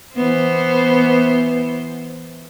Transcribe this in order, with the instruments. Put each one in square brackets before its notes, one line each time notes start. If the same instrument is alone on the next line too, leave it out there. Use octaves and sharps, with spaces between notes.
[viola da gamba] E3 B3 C5